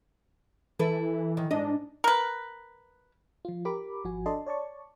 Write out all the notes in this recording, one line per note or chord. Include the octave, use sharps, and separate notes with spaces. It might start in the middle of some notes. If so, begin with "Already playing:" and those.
E3 E4 A4 B4
D#3
G#2 D4 D#5
A#4 B4
F3 F4
G4 A#4 B5 D6
G#1 F3 F#4 G#5
D4 A4 D5 D#5 A5 C6
C#5 D5 A5 C#6